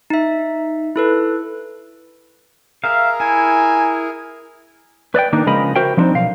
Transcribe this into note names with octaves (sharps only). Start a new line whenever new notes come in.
D#4 E5
E4 A4 B4
G#4 A#4 E5 F5 A#5
E4 G#5
B4 D5 D#5 G5
D#3 A#3 D4 D#4
C#3 F3 G#3 A#4 D#5 B5
F#4 A#4 C5 E5 G5
F3 A#3 C4 D4 D#4
B1 F5